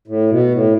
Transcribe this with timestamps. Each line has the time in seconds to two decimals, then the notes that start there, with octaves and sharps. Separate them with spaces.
0.08 A2
0.30 B2
0.51 A2